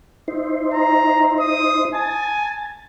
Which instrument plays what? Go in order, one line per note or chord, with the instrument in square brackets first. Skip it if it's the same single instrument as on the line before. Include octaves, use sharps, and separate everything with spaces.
[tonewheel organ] D#4 E4 C5
[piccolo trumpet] A#5
D#6
[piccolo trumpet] G#5 [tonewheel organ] A5